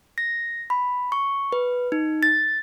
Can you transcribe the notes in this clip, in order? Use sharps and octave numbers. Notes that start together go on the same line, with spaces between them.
A#6
B5
C#6
B4
D#4
A6